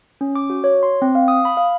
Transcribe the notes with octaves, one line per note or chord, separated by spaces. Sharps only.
C#4
D6
F#4
C#5
C6
C4
F5
D#6
B5
F5